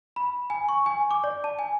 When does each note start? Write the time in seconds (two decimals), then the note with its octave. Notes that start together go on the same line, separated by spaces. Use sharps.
0.16 B5
0.50 G#5
0.69 C#6
0.86 G#5
1.11 D6
1.24 D5
1.44 A5
1.59 G#5